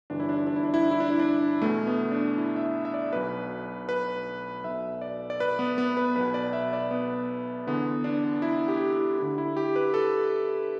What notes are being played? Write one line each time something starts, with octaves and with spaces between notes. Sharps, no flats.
G1 G2 E3 D4
E4
D4
E4
D4
E4
D4
E4
D4
E4
D4
E4
D4
E2 B2 A3
B3
D4
E4
E5
E5
D5
B1 B2 B4
B4
B1 B2 E5
D5
D5
B4
B3
B3
B4
B1 B2 B4
D5
E5
D5
B3
E2 D3 B3
D4
E4
G4
E4
D2 D3 E4
E4
G4
B4
A4